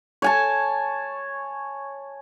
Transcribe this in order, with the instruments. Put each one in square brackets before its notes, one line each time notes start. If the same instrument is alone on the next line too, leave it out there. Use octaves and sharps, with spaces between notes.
[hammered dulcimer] C#5 G#5 A5